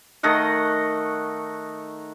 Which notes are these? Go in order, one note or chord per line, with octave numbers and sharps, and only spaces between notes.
D#3 A3 D#5 F#5